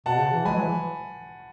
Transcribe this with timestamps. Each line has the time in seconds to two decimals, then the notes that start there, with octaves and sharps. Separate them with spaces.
0.06 B2 F#5 A5
0.19 C#3
0.32 E3
0.45 G#3 G#5 B5
0.55 F#3
0.63 E3